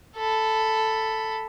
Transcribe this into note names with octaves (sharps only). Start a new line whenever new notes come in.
A4 B5